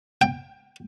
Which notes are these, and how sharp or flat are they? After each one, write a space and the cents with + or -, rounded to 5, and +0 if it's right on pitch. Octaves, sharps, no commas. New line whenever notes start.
G5 +15